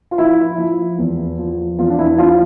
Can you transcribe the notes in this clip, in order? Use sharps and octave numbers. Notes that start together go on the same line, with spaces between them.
F4
F3 E4
F3
E2
F3
E2 F4
D4
E4
F3 F4